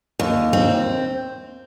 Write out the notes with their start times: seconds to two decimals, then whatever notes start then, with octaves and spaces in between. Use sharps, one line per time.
0.19 D#2
0.53 C4